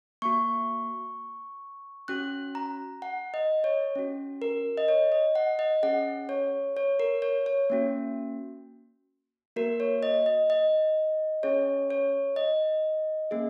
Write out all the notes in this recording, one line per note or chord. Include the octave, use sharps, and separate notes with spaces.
A#3 F#4 C#6
C#4 F#4 F#6
A#5
F#5
D#5
C#5
C#4 F#4
A#4
D#5
C#5
D#5
F#5
D#5
C#4 G#4 F#5
C#5
C#5
A#4
C#5
C#5
A#3 C#4 F#4
A#3 F#4 A#4
C#5
D#5
D#5
D#5
C#4 G#4 C#5
C#5
D#5
A#3 C#4 G#4